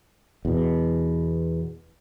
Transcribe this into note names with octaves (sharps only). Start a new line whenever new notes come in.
E2 B2